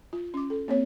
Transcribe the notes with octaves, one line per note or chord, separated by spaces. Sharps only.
F4
C#4 D6
A4
A#3 C4 C#5